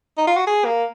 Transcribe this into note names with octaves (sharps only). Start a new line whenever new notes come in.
D#4
F4
F#4
G#4
A#3